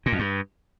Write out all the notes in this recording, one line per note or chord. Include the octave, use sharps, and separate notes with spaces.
A#2
F2
G2